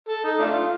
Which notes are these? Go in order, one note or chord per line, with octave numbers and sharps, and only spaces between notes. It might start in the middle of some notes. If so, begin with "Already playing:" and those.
A4
D#4
A3 D4 F4